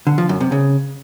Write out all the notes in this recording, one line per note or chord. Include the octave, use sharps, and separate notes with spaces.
D3
F3
F#2
C3
C#3